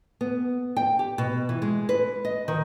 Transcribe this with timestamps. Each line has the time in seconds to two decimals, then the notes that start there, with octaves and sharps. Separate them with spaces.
0.21 B3
0.77 G5
0.99 G4
1.18 B2
1.49 E3
1.62 G#3
1.89 B4
2.25 D#5
2.48 D#3